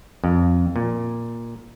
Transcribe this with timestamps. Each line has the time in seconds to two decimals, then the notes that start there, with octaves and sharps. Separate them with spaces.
0.24 F2
0.76 A#2